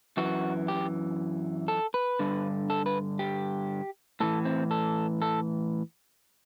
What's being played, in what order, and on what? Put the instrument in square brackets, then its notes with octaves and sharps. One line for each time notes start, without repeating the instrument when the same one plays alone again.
[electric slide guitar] F#2 E3 F#4
G4
A4
B4
G2 D3
A4
B4
G4
A2 E3 A4
C4
A4
A4